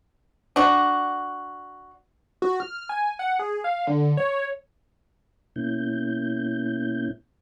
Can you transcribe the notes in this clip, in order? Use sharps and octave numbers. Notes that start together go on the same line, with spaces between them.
D4 F#4
F#4
F6
G#5
F#5
G#4
F5
D3
C#5
B2 A#3 C#4 E4 G6